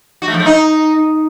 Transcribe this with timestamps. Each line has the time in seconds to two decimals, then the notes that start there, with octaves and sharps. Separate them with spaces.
0.22 F#4
0.28 A3
0.34 F3
0.40 A3
0.46 D#4